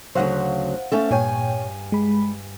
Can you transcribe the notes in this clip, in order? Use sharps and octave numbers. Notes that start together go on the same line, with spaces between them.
D2 C#3 F#3 C5 F5 F#5
A3 C#4 A4
G2 A#2 C#5 G5 G#5
G#3 B5